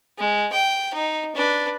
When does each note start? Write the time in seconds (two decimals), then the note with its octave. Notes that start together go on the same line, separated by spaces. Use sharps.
0.18 G#3
0.52 G5
0.94 D#4
1.35 D4 B4